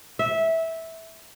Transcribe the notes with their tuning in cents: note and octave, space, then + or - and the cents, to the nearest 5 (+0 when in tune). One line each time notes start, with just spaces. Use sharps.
E5 -15